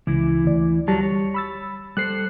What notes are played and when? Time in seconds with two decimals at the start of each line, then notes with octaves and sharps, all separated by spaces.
0.07 C#2 E3 E4
0.44 D2 D5
0.88 F#3 G3 A5
1.03 C#5
1.34 B5 E6 A6
1.97 G3 A4 C5 F#6 C7